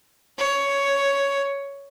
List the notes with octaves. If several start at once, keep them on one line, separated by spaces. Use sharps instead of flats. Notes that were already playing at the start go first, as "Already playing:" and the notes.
C#5